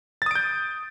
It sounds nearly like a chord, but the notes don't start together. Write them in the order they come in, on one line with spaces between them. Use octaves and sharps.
A6 D#6 D7 G6